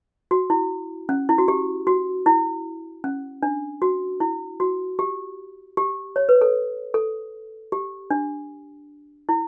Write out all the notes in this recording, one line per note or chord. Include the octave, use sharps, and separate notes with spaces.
F#4
E4
C#4
E4
F#4
G4
F#4
E4
C#4
D4
F#4
E4
F#4
G4
G4
C#5
B4
A4
A4
G4
D4
E4